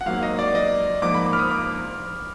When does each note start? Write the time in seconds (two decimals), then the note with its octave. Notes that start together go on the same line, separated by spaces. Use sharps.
0.01 F#5
0.06 G#2 F#3 A#3 F5
0.23 D#5
0.39 D5
0.55 D#5
1.02 G#2 F3 A#3 D6
1.14 B5
1.26 D6
1.33 F6
1.39 D#6
1.51 D6